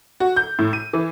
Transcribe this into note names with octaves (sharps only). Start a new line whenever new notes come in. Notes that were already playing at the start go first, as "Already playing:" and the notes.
F#4
G6
A2
D#7
E3